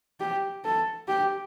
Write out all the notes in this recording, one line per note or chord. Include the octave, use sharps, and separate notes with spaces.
G4
A4
G4